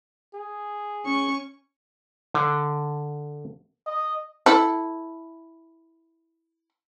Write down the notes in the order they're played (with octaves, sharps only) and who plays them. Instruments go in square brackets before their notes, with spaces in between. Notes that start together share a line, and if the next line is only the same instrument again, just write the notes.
[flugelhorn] G#4
[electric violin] C#4 C#6
[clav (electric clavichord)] D3
[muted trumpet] D#5
[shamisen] E4 A4